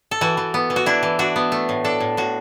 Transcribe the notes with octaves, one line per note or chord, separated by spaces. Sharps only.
A4
E3 F#4
E3
B3
E3
F#4
D4 E4
E3
D4 F#4
B3
A3
A2
D4 A4
A2
A2 F#4